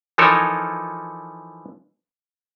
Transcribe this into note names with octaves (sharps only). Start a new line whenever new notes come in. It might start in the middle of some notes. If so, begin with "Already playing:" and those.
E3 F3 D#4 A4 A#4 C#5